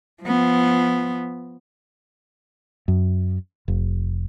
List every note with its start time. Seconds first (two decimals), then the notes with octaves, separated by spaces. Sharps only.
0.23 F3 B3
2.88 F#2
3.68 F1